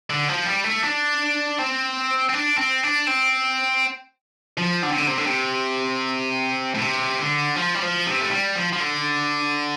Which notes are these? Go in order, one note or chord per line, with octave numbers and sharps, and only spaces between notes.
D3
F3
G3
A3
D4
C4
C4
D4
C4
D4
C4
F3
D3
C3
D3
C3
D3
C3
A2
C3
D3
F3
G3
F3
C3
A3
G3
F3
F3
D3